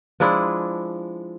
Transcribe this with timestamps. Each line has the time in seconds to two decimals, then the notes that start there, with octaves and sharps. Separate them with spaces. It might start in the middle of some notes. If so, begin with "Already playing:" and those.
0.20 F3 G#3 D4 E4